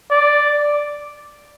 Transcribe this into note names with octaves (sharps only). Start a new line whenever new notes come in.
D5